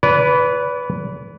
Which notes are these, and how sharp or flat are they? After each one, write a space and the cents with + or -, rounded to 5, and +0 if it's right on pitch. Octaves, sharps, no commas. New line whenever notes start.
B4 +0 D5 -40